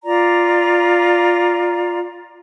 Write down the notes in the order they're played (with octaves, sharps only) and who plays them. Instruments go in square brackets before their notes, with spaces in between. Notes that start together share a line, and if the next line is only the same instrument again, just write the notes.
[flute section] F4 D5 A#5